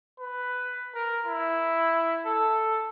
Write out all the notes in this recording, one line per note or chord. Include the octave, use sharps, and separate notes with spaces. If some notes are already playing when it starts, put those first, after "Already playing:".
B4
A#4
E4
A4